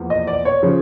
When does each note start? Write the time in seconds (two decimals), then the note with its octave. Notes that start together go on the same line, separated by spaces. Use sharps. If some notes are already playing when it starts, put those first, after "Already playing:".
Already playing: E2 F3 A#3
0.10 D#5
0.27 D5
0.45 C#5
0.63 C#3 F3